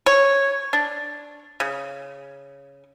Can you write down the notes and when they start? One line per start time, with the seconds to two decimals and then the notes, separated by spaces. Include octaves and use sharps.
0.06 C#5
0.73 D4
1.60 C#3